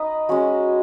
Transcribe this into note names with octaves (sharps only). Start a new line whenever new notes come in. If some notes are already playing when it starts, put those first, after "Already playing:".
Already playing: D#4 B4 D#5
G#3 C#4 F#4